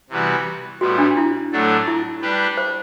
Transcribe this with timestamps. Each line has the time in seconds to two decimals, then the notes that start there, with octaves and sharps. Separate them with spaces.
0.10 C3 E3 G3 B3 F#4
0.80 A2 G3 B3 F#4
0.98 D4
1.17 E4
1.52 A2 F#3 A3 D4 A4
1.88 E4
2.22 G3 D4 G4 B4
2.57 C5